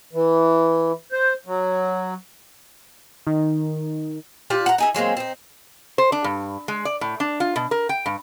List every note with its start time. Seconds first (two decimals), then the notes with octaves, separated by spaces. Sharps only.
0.13 E3
1.12 C5
1.46 F#3
3.27 D#3
4.50 D4 F4 G4 D5
4.66 F#5 A#5
4.78 D#4 G#4 E5
4.95 F#3 G#3 A#3 C4
5.17 C4 D#4
5.98 C5
6.12 D4
6.24 G2
6.68 G#3
6.85 D5
7.01 A2
7.20 D4
7.40 F4
7.56 B2
7.71 A#4
7.89 G5
8.06 G2